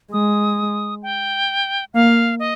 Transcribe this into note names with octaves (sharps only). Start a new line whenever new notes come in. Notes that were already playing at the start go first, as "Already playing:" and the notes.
G#3 D#6
G5
A#3 F5
D#5